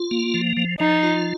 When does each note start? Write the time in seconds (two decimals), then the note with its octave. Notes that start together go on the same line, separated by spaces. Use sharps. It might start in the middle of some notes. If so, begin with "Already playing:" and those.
Already playing: F4
0.11 A#3
0.34 F3
0.57 F3
0.80 F3 D#4
1.03 F4